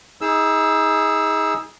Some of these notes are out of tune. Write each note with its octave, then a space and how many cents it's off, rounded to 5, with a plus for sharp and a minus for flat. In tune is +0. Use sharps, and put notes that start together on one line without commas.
D#4 +35 G#4 -5 E6 +0